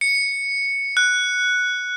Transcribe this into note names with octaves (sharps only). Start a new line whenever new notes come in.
C#7
F#6